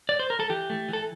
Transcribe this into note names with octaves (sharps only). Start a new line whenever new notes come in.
D5
C5
A#4
A4
E3 G4
A3
E3 A4